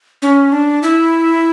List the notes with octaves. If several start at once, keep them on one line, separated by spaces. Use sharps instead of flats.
C#4
D4
E4